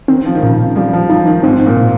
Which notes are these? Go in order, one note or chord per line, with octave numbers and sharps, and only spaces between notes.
D#3 C4
F3
D#3
A#2 C#3
F3 G3
F3
F3 D#4
D#3
G#2 C4
A#2
A#2